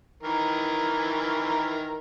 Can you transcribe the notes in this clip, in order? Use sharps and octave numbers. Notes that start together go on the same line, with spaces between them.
D#3 E3 A#4